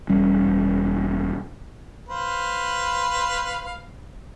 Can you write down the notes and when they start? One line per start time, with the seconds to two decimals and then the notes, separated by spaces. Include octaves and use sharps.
0.09 E1 G3 C#4
2.09 B4 C5 F5